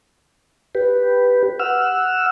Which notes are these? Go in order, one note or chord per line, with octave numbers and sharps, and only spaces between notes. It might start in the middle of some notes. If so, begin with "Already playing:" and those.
G4 B4
F#5 E6 F6